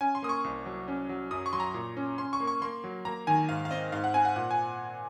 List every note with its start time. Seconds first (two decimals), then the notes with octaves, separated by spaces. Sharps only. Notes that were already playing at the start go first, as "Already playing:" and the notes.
0.01 C#4 G#5
0.15 C6
0.23 A#3 D#6
0.29 C#6
0.44 C2
0.66 F#3
0.88 C#4
1.09 F#3
1.31 F#2 D#6
1.46 C#6
1.53 F#3 C6
1.60 A#5
1.74 A#2
1.97 C#4
2.18 C#4 C6
2.33 C#6
2.40 A#3
2.47 C#6
2.62 A#3 C6
2.84 F#3
3.05 A#3 A#5
3.27 D#3 G#5
3.49 G#2 F5
3.65 F5
3.71 C4 D#5
3.92 G#2 F5
4.04 F#5
4.14 C4 G#5
4.25 F#5
4.36 A#2 F#5
4.51 G#5